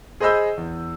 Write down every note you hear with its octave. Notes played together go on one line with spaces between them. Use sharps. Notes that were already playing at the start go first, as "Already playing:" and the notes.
G#4 C5 D#5 B5 E6 G6
E2